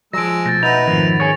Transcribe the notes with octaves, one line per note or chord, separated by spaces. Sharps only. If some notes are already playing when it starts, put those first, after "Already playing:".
F3 F#3 G#3 E6 A#6 D7
B2 A3 G6 A6 A#6
D#4 F#4 B4 E5 F7
F2 G#2 D#3 F3
G#4 C#5